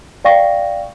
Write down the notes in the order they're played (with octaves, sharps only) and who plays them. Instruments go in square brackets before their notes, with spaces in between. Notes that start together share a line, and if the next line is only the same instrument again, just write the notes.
[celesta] D5 F5 G5 C#6 A#6